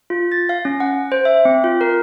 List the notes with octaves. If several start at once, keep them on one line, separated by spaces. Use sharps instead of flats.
F4
A6
F5
C#4
F#5
C5
E5
C4
F4
A#4